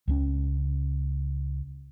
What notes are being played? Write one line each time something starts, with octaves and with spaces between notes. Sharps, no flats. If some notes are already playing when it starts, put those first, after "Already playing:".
C#2 F#3 C#4